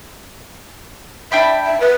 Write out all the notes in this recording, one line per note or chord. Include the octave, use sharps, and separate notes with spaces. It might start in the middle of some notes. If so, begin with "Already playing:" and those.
D4 E5 G5 B5
E5
B4